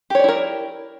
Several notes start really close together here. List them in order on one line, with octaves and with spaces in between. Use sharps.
G4 C#5 D5 E4 A#4